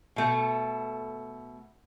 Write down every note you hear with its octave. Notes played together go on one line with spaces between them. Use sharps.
B2 A3